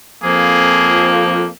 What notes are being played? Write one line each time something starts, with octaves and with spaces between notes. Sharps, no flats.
F2 F3 A#3 G#4